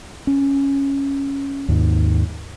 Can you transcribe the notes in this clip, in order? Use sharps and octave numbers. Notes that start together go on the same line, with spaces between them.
C#4
D#2 G#2